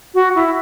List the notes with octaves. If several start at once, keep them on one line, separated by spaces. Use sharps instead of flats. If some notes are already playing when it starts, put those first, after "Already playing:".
F#4
E4